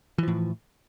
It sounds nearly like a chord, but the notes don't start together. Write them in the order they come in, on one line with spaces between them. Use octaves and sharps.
E3 F3 A2